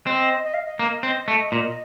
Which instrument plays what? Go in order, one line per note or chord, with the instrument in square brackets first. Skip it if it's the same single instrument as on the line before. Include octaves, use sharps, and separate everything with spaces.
[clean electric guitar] C4 [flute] D#5
[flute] D#5
F5
D#5
[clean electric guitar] A#3
C4
A3
A#2